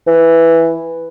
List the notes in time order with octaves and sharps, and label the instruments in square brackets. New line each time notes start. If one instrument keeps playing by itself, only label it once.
[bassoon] E3